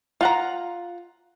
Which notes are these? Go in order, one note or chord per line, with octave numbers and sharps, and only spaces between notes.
F4 F#5 A#5